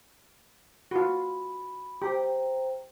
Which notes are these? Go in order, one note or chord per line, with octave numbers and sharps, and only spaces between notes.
F4 F#4 B5
G4 C5 G5 A#5